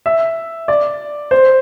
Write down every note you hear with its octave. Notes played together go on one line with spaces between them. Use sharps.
E5
D5
C5